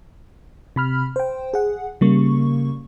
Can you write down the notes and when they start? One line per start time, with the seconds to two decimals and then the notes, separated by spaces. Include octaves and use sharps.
0.76 C3 B5 F6
1.16 C5 G5
1.54 G#4 F#5
2.01 C#3 G3 A#3 C#6